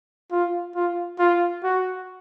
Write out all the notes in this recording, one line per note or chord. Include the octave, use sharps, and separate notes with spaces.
F4
F4
F4
F#4